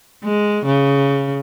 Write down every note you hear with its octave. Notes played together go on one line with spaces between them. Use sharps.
G#3
C#3